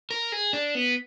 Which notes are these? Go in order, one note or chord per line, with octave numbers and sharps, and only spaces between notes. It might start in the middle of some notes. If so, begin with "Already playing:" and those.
A#4
G#4
D4
B3